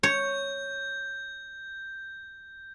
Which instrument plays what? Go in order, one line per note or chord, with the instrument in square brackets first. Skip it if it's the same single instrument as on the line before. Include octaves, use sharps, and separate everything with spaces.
[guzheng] C#5 [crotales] G6